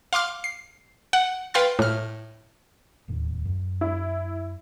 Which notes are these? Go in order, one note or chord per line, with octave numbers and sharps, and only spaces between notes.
F5 C6 D6 F6
C7
F#5
B4 F5 G5 C6 F6 A6
A2 F6
D1 D#2 A2
F#2
E4